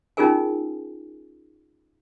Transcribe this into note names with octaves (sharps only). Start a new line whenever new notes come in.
C#4 D#4 F4 G#4 A#4 G#5